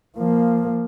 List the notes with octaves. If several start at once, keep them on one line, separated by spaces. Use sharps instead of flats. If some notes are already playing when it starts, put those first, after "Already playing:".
F3 A#3